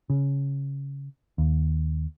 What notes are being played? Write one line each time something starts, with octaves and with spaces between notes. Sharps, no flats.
C#3
D#2